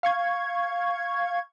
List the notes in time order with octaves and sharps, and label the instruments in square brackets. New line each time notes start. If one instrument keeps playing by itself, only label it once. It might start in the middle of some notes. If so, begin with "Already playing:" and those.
[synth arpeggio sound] F5 C#6 G#6